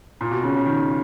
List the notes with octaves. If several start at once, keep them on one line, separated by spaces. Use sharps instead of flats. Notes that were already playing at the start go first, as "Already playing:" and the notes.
A#2
B2
C#3
C#3
D#3